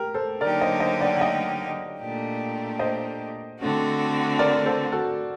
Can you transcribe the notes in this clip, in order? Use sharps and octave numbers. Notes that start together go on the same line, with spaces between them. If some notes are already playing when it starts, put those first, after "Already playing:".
Already playing: G4 A#4
A4 C5
D3 F#3 A#3 D#4 G4 A#4 D5
C5 D#5
C5 D#5
D5 F#5
F#5
D#5 G5
A#2 A3 D4 G4
C5 D#5
D3 A3 C4 F#4
A#4 D5
A4 C5
F#4 A4